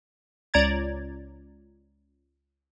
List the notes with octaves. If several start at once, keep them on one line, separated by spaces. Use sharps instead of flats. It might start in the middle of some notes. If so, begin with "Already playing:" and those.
C#2 D5 A#5 G#6 A6